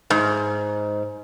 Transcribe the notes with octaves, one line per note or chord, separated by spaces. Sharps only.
G#2